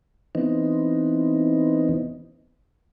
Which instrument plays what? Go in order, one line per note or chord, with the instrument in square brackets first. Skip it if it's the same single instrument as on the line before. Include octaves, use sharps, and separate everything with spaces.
[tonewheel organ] E3 B3 C4 D#4